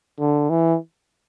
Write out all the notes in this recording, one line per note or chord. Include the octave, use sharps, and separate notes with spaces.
D3
E3